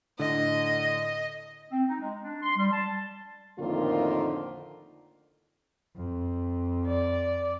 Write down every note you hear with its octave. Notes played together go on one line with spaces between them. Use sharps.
A2 D3 D#5
C4
D#4
G#3
D4
C6
G3
A5
F2 A2 D3 D#3 A#3 F4
F2
D5